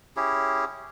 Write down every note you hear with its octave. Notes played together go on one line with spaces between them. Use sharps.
C#4 E4 G4 G#4